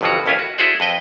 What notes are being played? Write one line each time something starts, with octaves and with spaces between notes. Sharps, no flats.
G1 F2 B2 E3 F4 F#4
A1 D#2 C#4 E4 F4 G#5
F#4
E4 F#4 G#4 A4 C5 D5
F2 B4 D#5 G5